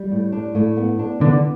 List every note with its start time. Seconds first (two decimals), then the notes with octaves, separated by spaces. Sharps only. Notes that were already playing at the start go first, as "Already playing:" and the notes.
Already playing: G3
0.11 A2
0.32 D4
0.55 A2
0.77 B3
0.99 D4
1.21 D3 B3